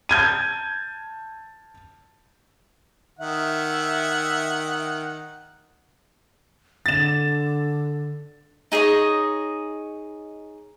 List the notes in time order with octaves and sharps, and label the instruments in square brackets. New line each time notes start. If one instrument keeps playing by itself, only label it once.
[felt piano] A5 G6 G#6 D#7
[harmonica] D#3 F#5 [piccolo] E5
[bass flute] D3 [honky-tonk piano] A6 E7
[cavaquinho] D#4 G#4 C#5 D#5